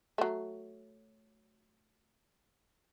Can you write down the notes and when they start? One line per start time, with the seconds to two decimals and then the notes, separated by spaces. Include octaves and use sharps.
0.18 F#3 A3